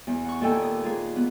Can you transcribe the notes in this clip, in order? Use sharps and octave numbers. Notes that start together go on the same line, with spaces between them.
E2
F#5 C#6
D#2 A#2 A#3 A4 G5 G#5
D#6
A#3 F4 G#4
B3